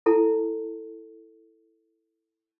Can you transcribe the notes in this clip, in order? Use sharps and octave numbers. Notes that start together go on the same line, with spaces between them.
E4 A4 A5